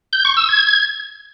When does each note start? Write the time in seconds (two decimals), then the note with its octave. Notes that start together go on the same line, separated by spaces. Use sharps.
0.13 G6
0.25 C#6
0.37 E6
0.49 G#6